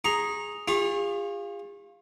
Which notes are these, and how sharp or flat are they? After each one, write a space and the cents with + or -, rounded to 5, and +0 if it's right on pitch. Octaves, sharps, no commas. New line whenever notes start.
G#4 +0 A#5 +0 C#6 -30
F4 +0 G#4 -45 C#6 -35